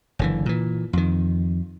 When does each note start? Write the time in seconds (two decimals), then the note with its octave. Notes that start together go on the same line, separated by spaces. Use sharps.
0.19 F#1 D3 E3
0.46 A#2 E3
0.93 F2 D#3